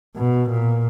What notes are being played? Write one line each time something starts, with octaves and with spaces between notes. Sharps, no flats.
B2
A#2